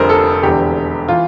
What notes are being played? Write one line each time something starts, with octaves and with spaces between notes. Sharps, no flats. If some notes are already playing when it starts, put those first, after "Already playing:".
Already playing: F1 F2 D3 G3 A#4 C5
A4
E1 E2 D3 G4
E3 F4